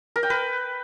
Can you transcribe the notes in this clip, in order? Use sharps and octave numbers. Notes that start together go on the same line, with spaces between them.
A#4
G5
B4